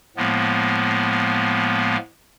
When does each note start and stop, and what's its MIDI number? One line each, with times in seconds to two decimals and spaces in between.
0.17 1.97 45
0.17 1.97 53
0.17 1.97 56
0.17 1.97 58
0.17 1.97 59